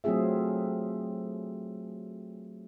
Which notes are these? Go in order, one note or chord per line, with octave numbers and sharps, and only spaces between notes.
F#3 A3 C4 F4 G#4 E5